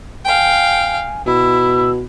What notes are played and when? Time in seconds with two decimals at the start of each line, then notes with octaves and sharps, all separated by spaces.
0.25 F5 G5 G#5
1.26 B2 E4 E6